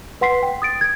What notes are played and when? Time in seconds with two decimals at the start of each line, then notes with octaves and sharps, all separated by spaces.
0.21 B4 F#5 C6 B6 C7
0.43 G5
0.62 D#6 A6 D7
0.81 G#6